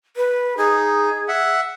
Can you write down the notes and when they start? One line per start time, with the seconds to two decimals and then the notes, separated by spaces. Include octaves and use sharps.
0.17 B4
0.57 D#4 G#4
1.28 E5 F#5